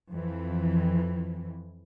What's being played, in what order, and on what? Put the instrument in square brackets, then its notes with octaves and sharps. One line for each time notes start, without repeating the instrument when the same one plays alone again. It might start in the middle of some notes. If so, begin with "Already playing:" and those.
[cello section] F2 E3